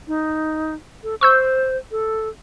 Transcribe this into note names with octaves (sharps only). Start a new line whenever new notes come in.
D#4
A4
C5 C#6 E6 G6
A4